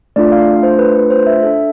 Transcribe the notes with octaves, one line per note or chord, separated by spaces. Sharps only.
A3 D4 F4 D5
F5
C5
B4
B4
C5
E5
D4 A4 E5